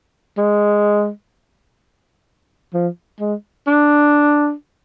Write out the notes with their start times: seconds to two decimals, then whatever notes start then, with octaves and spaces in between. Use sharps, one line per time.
0.38 G#3
2.74 F3
3.20 G#3
3.67 D4